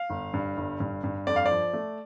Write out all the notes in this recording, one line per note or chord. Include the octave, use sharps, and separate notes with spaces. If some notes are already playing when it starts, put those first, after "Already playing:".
Already playing: F5
G1
G2
G1
G2
G2
F2 D5
F5
F3 D5
A3